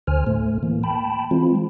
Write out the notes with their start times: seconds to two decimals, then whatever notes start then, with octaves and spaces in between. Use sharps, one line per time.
0.07 D2 D3 C5 G#5 F6
0.27 A2 A3
0.63 E3 A#3
0.83 G5 A5 B5
1.31 E3 G#3 C4 F4